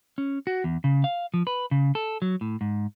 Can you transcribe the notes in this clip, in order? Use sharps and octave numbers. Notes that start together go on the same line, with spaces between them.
C#4
F#4
E2
C#3
F5
F3
B4
C#3
A4
F#3
A2
G#2